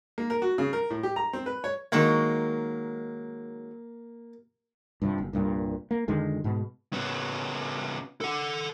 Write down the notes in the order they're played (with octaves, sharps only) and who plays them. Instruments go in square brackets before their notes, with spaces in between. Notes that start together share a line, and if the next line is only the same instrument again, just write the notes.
[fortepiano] A#3
A#4
F#4
C#3
A#4
A2
G4
A#5
C4
B4
C#5
[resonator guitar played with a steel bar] D#3 F#3 G#3 [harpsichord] A#3
[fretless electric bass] G2 C3 F3
F#1
C2 G2 A#2
A#3
F2 D3 D#3 G#3
G#2 B2
[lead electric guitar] C#3 B3
A4 F#5